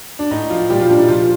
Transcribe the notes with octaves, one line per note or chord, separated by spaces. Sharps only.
D4
A2 D#4
F3 F4
A#2 G3 G4
F3 F4
D4
D#4
A#2 F3 F4